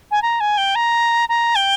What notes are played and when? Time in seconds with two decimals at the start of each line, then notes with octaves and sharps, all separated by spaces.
0.11 G#5
0.22 A#5
0.40 G#5
0.57 G5
0.75 A#5
1.29 A#5
1.55 G5